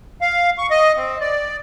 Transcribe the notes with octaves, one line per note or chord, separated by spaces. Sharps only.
F5
C#6
D#5
C4
D5